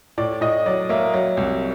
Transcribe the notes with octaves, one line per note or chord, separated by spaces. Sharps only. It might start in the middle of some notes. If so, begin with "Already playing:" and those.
A2 D5
A2 D#5
F#3 D5
A#3 E5
F#3
C2